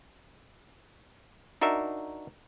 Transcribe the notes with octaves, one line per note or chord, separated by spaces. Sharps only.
D4 D#4 F#4 A#4 E5